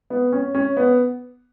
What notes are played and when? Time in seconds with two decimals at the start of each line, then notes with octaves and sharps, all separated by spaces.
0.10 B3
0.32 C#4
0.55 C#4
0.77 B3